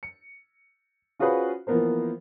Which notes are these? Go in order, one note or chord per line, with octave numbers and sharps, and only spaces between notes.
C#7
C#4 F4 F#4 G#4 B4 C5
E3 F3 A#3 B3 A#4 C5